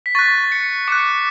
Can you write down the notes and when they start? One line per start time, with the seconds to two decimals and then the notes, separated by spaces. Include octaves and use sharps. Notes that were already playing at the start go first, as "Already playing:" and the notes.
0.06 B6
0.15 C#6 F#6 A6
0.52 C#7
0.88 D6 F#6 C#7